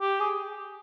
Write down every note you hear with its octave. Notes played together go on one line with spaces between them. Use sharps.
G4
G#4